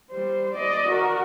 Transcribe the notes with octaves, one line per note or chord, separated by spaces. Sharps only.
G3 C5
D5 D#5
F#4 A#4